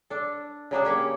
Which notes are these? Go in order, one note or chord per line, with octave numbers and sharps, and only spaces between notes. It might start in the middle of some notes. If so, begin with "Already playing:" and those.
D4 A4
C#3 F#3 D4 G#4
A#3 G4 C#5